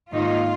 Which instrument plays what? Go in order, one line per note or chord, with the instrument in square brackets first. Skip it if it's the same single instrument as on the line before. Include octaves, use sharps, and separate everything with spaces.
[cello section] G#2 D#3 A#3 D#4 F4